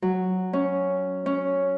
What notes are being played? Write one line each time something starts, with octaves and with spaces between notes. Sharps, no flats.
F#3
C#4
C#4